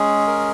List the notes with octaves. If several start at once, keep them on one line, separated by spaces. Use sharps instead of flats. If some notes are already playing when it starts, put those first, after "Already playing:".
Already playing: G#3 C#4 G#4
A#4